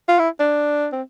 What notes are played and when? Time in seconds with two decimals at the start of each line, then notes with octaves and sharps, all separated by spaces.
0.08 F4
0.19 E4
0.40 D4
0.92 C4